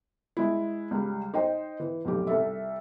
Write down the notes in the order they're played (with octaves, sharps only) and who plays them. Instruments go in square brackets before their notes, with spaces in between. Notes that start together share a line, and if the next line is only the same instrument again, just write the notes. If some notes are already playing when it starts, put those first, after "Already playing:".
[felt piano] G#3 E4
C#2 G3
D#4 C5 D#5 G5
E3
F1 B1 G4
C2 A4 E5